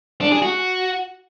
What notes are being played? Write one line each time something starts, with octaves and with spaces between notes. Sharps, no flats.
D4
G#4
F#4